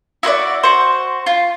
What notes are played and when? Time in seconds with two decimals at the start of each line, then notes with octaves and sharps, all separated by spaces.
0.23 E4 F#4 C5 D5
0.63 F#4 C5
1.26 F4